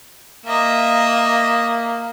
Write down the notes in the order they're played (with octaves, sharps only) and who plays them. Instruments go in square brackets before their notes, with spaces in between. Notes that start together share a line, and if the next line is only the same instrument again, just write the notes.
[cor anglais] A#3 [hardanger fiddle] D#5 E5